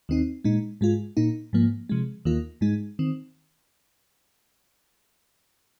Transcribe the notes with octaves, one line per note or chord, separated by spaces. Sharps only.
D#2 D#3 C4 D#4
A#2 G#3 D#4
G#2 G#3 F4
A#2 A#3 D#4
G#2 F3 A#3
C3 F3 G#3
D#2 D#3 A#3 F4
G#2 G#3 D#4
D#3 C4